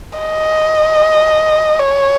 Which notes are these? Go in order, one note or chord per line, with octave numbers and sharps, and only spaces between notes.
D#5
C#5